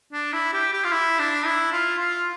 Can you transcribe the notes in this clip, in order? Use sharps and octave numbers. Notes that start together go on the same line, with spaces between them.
D4
E4
G4
G4
F4
E4
D4
E4
F4
F4